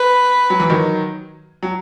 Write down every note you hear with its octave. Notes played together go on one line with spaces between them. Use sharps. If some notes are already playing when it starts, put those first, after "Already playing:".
Already playing: B4
F#3
E3
D#3 F#3
F#3